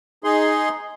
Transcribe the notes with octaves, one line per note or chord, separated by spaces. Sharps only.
D#4 G#4 C6